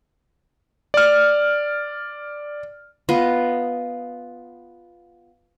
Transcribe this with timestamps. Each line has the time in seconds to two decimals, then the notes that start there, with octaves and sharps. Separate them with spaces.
0.94 D5 F6
3.09 B3 F4 D#5